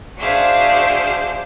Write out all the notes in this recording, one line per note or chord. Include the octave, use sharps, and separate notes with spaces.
D4 F#4 G#4 C5 E5 F5